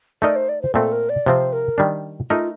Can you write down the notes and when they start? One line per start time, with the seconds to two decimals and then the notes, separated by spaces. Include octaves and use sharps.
0.22 A3 D#4 A#4 D5 D#5
0.36 C5
0.49 D5
0.62 C5
0.74 A#2 A3 C4 A4
0.92 A#4
1.09 D5
1.26 C3 F3 C4 C5
1.53 A#4
1.78 D#3 G3 D4
2.30 A3 D#4 F4 A#4 D#5